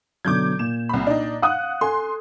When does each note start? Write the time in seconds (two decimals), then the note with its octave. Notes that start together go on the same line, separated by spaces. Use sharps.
0.25 B2 D3 F#3 D6 G6 G#6
0.59 A#2 E7
0.89 C2 B5
1.07 D4 D#4
1.42 F5 F#5 D#6 F#6
1.81 A4 G#5 C6